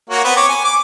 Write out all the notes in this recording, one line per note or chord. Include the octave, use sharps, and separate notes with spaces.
A#3 F#4 C#5
B3 C4 B4
C#5 D6
G#5
D6